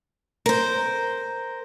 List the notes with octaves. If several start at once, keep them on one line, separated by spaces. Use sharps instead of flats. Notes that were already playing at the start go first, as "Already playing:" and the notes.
A#4 C5